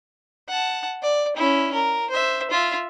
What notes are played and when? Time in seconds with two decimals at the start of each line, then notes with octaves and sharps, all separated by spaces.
0.48 F#5 A5
1.03 D5
1.37 C#4 E4
1.74 A#4
2.10 C5 E5
2.51 F4 E5